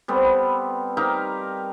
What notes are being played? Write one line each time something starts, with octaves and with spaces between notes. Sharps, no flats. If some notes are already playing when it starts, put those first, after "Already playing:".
G3 B3 C4 A4
D#4 G4 A#4 F5